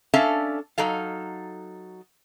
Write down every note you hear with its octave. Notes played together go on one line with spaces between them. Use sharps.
C#4 D4 A4 E5 F5 A5
F#3 D#4 A4 F5